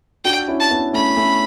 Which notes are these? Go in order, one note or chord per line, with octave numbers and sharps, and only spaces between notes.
D4 F#4 G5
C#4 E4
A5
B3 D4
A3 C#4 B5
A3 C#4